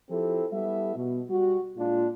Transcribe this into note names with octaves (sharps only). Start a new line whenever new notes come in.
F3 C4 E4 G4 A4
G3 B3 E4 G4 A4 E5
B2
G3 F#4
A#2 G#3 D4 F4